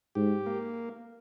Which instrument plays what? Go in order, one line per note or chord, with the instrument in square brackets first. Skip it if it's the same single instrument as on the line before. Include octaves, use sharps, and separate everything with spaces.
[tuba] G#2 [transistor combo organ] G4
[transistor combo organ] A#3